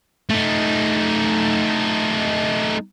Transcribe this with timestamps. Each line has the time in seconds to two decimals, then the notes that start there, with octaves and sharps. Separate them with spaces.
0.30 A3 D#4